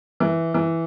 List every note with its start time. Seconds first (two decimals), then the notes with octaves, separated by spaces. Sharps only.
0.20 E3
0.54 E3